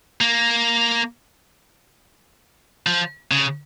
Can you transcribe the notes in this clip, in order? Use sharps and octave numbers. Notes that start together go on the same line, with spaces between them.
A#3
F3
C#3